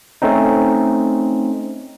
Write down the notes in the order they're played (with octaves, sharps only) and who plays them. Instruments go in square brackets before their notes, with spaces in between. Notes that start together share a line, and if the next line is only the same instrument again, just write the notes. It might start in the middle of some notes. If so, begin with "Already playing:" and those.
[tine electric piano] A3 C4 C#4 D#4